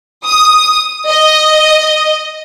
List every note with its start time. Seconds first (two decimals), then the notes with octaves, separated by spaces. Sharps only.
0.24 D#6
1.08 D#5